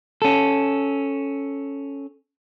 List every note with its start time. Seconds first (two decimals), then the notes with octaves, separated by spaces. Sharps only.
0.22 C#4 A4